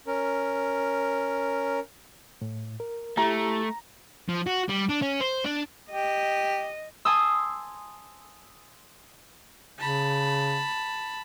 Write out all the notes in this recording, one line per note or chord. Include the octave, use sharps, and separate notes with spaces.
C#4 A#4
A2
A#4
A3 E4 G4 A#5
F3
F#4
G3
D4
C#4
C5
D4
G4 D#5
G#5 A5 C6 D#6 E6
C#3 A5 B5